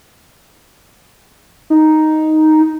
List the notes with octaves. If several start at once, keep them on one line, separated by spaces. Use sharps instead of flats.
D#4